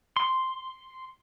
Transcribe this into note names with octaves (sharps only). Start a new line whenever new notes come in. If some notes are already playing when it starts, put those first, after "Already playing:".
C6